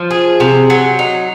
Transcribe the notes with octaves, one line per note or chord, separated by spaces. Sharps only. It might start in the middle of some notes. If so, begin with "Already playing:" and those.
Already playing: F3
G#4
C3
F#3
D#4